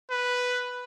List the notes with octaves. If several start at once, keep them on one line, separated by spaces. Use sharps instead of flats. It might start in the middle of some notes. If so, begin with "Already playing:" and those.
B4